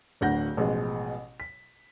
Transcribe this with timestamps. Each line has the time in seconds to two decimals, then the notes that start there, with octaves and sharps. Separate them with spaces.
0.21 D1 D2 D3 F#5 G6 A#6
0.57 A1 B2 F3 G#3
1.40 B6